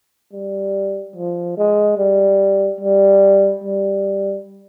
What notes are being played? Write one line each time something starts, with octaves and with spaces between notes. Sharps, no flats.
G3
F3
G#3
G3
G3
G3